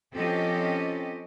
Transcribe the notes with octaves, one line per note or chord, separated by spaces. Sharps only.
F3 C4 C#4 G4 A4 D#5